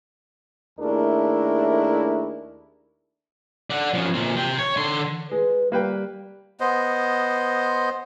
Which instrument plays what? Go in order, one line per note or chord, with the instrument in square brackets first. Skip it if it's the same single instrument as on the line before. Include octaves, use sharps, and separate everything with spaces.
[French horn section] D#2 A3 D4 E4 G#4 A#4
[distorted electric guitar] D5 F#5
F3 C#4
A#2 C4
C3 G5
C#5
D3 C6
[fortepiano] G#3 [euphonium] B4
[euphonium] G3 [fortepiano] A#3 B4 G5
[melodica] B3 C5 D#5